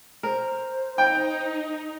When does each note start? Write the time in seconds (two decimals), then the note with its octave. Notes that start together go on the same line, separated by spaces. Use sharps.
0.23 A#4 C5
0.98 D#4 G5